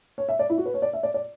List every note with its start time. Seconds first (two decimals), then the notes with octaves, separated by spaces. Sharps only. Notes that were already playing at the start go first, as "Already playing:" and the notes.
0.18 C#5
0.29 E5
0.39 D5
0.50 E4
0.58 F#4
0.66 B4
0.74 C#5
0.82 D5
0.93 E5
1.03 D5
1.14 D5